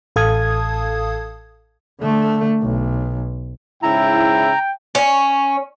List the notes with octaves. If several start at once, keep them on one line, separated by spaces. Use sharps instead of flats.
A1 A4 F5 A5 D#6 G#6
D3 A3
B1
G#2 C#3 E4 G5 A#5
C#4